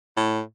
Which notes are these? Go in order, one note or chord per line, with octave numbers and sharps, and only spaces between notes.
A2